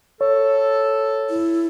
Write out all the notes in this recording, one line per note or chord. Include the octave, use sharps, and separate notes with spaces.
A4 C#5
E4